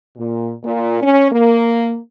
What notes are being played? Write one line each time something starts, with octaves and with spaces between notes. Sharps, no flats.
A#2
A#2
C#4
A#3